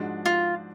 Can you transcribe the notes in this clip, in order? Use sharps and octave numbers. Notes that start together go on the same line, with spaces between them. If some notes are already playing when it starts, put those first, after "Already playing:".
Already playing: G#2 F3 G#3 D4 F#4
F4